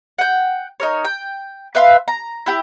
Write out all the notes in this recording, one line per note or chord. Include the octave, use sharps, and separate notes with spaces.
F#5 G5
D#4 A#4 C#5
G5
B4 E5 F5 C6
A#5
E4 G4 G5